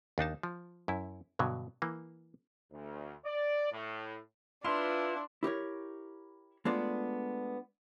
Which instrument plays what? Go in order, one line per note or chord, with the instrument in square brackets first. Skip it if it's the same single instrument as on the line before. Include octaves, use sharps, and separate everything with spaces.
[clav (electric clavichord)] D#2 D4 D#4 A5
F3
F#2 E4
G2 B2 D3 F#3
E3 A#3
[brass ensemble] D2
D5
A2
[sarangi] D4 [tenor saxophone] E4 [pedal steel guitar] F4 B4 [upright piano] C6
[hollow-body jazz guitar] E4 G4 A#4 C#5
G#3 A3 B3 D4 F4 D5